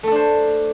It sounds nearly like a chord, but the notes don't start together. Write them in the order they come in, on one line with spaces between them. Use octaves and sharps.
A3 A4 D4 C5